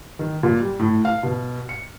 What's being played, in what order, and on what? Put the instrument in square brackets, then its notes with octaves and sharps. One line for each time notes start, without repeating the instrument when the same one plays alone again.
[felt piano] D#3
A#2
G3
A2
F5
B2
C#7